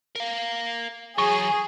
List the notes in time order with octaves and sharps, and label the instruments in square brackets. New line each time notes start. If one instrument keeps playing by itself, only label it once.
[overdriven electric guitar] A#4 F5
[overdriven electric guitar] E3 F#3 [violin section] G#4 [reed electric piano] C#6